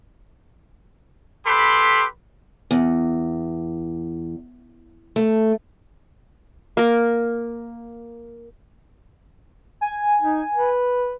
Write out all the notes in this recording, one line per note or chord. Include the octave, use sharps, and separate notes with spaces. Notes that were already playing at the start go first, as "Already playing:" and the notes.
G4 A4 B4 B5 C6
E2
A3
A#3 A#4
G#5
D#4
B4